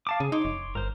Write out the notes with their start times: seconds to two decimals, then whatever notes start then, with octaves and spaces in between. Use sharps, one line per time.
0.07 F5 A5 D6
0.20 C#3 G#4
0.32 D#4 C#5 C6 D6
0.45 F1
0.75 G1 A#4 C5